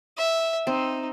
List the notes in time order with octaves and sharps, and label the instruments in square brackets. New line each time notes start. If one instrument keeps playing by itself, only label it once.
[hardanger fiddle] E5
[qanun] C4 [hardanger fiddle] D#4